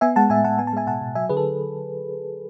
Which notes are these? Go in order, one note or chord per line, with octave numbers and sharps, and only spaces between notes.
B3 E5 G#5
G#3 F#5 A5
A2 E5 G#5
A2 F#5 A5
B3 G#5
A5
G#3 E5 G#5
B2 F#5 A5
B2
F#3 E5 G#5
D3 G#4 B4
A4